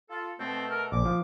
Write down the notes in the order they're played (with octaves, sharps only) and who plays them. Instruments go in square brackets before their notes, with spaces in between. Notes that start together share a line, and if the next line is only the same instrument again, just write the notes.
[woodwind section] F4 A4
[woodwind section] B2 A3 A4 [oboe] C4
[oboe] A#4
[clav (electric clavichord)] A#1 [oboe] D6
[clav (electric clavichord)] F3